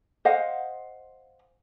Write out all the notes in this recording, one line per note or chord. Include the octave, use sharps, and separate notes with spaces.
C5 D#5 F5 F#5